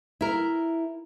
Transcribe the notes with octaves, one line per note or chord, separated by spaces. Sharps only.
E4 A#4